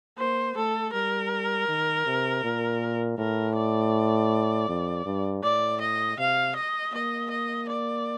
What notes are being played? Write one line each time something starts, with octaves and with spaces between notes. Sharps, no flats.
A#3 C5
A3 A4
G3 A#4
D#3
C3
A#2
A2 A#4
D5
F2
G2
A2 D5
D#5
C3 F5
D#5
A#3 D#5
D#5
D5